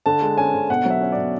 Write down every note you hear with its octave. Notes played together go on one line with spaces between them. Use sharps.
D3 A5
G#3
C#4 G#5
D3
B2 F#5
F#3 E5
C#4
D5
B2